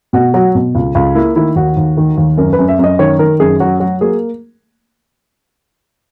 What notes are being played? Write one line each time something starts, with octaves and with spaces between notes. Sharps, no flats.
B2 F#4
F#3 F#4
B2
C#2
C#2
A#3 E4
D#3 E4
D#2 F#4
D#2
D#3
D#2
F#2 A#4
B4
F#2
E5
F#2 D#5
D#3 C#5
D#3 A#4
F#2 G#4
F#3 F#4
F#3 F#4
A#3 G#4